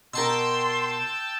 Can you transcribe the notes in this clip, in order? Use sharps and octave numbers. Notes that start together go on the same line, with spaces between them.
B2 A#4 G5 A5 C6 E6